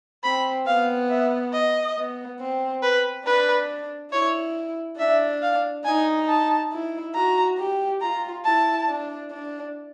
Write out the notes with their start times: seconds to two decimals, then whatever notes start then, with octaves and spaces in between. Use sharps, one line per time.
0.24 C4 B5
0.67 B3 F5
1.10 E5
1.53 D#5
1.97 B3
2.40 C4
2.83 B4
3.26 D4 B4
4.12 E4 C#5
4.99 D4 E5
5.42 F5
5.85 D#4 G#5
6.29 A5
6.72 E4
7.15 F#4 A#5
7.58 G4
8.01 F4 A#5
8.45 E4 A5
8.88 D4
9.31 D4